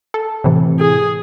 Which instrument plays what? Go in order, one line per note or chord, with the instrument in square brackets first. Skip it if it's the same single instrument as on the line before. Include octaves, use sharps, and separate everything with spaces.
[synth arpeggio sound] A4
A2 C3 E3
[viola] G#4